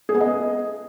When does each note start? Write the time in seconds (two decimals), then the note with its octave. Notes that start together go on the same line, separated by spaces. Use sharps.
0.09 G#4
0.15 B3
0.20 D#5